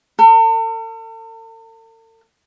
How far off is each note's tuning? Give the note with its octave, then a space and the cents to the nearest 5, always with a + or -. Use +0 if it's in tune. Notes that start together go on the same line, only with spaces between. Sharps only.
A4 +45